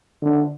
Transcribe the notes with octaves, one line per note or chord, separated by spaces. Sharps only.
D3